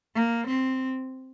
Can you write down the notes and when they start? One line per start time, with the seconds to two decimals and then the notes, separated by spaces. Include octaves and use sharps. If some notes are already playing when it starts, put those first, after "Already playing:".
0.15 A#3
0.48 C4